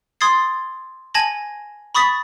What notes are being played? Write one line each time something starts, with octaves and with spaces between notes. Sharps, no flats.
C6 D#6 G#6 A6 C7
G#5 A5 G#6 A#6 F#7
B5 C#6 D#6 A6 B6